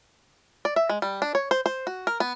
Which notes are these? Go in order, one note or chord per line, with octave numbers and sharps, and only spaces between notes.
D5
E5
G#3
G3
D4
C#5
C5
C5
F#4
A#4
B3